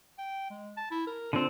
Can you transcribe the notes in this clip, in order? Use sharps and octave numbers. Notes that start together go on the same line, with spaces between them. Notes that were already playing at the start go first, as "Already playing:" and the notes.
G5
G#3
A5
E4
A#4
D3 C4 F4